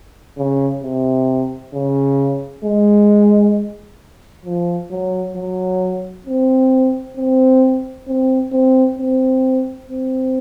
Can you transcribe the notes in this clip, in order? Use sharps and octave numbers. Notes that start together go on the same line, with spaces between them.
C#3
C3
C#3
G#3
F3
F#3
F#3
C4
C4
C4
C4
C4
C4